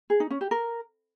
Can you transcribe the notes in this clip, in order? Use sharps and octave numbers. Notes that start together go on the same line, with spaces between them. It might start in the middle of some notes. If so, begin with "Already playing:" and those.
G#4
D#4
C#4
G4
A#4